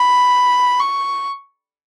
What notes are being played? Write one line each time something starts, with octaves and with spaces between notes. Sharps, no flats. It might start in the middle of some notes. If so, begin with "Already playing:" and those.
Already playing: B5
C#6